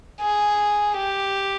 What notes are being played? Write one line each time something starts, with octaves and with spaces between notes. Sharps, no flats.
G#4
G4